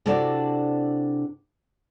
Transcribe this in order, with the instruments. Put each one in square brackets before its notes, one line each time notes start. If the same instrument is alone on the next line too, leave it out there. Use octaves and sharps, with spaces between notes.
[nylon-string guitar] C3 D4 E4 F#4 A4 D5